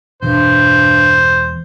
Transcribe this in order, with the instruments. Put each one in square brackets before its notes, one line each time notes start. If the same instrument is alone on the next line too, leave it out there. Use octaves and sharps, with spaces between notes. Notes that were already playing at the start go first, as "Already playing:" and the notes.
[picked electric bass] E1 B2 E3 [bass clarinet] G2 [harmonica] C5